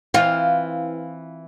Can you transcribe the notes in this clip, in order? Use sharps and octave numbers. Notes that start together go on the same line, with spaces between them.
E3 C4 F4